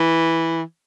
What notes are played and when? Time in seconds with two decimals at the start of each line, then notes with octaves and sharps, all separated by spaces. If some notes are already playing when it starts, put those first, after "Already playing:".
Already playing: E3